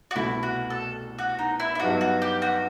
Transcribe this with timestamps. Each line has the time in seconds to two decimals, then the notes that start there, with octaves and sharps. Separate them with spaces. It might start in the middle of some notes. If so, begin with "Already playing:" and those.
0.11 F#4
0.15 C2 B2 A3 E4
0.43 F#4
0.70 A4
1.19 F#4
1.39 D#4
1.60 E4
1.75 E4
1.80 G2 F#3 B3 D#4 F#4
2.01 F#4
2.22 G4
2.42 F#4